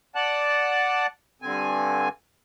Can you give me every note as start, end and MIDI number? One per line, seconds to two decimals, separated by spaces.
0.15 1.07 74
0.15 1.07 78
0.15 1.07 81
0.15 1.07 90
1.42 2.09 43
1.42 2.09 50
1.42 2.09 60
1.42 2.09 80